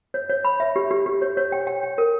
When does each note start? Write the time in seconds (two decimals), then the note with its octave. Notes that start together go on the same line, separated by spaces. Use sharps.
0.14 C#5
0.29 C#5
0.45 B5
0.60 E5
0.76 G4
0.91 G4
1.06 G4
1.22 C#5
1.37 C#5
1.52 G5
1.67 G5
1.83 G5
1.98 A#4